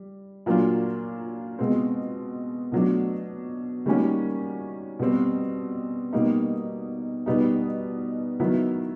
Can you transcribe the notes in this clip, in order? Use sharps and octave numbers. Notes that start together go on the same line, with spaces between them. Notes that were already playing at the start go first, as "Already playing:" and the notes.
Already playing: G3
A#2 F#3 A#3 D4 F4
B2 G#3 C4
B2 F#3 A3 D4
D#3 G3 A#3 C#4 F#4
B2 G3 C4
B2 G3 A#3 D#4
B2 G3 B3 D#4
D#3 F#3 B3 E4